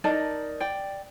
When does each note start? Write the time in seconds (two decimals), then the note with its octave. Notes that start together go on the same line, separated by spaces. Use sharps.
0.04 D#4 A#4 D5 A5
0.60 D5 G5